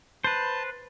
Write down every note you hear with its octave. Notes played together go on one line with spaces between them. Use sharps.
B4 C5 A5